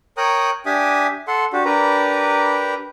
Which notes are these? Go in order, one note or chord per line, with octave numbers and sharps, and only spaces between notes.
A#4 C#5 G5 A#5 D#6 F#6
D4 G4 E5 G#5 D#6
A4 F#5 C6
D4 F#4 G4
D4 G4 A#4 B4 A#5